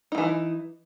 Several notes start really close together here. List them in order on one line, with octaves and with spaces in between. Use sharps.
D#4 F#3 E3